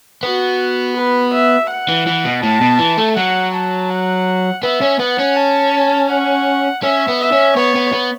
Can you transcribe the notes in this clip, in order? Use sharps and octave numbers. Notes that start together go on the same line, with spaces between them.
B3 F#4
B4
E5
F#5
E3
E3
B2
A2 A5
B2
E3
A3
F#3 F#5
A5
F#5
B3 E5
C#4
B3 F#5
C#4
A5
F#5
C#4 E5
B3
E5
C#4
B3 C#5
B3
B3